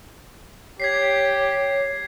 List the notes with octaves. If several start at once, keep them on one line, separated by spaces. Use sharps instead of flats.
G4 C#5 G#6 B6 C7